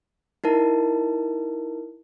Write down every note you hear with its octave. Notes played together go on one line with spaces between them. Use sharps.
D#4 E4 A#4 A5